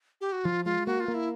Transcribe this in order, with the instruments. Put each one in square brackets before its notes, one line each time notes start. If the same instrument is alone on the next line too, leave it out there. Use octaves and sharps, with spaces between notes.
[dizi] G4
F#4
[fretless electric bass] F3 [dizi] F4
[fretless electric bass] G#3 [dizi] F4
[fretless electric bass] A#3 [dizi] F#4
[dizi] F4
[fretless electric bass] A#3
[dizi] E4